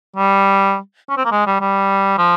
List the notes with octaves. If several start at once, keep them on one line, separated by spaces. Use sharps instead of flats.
G3
C#4
C4
A#3
G#3
G3
G3
F3